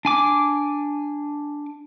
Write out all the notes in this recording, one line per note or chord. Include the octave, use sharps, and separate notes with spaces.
D4 G#5 D6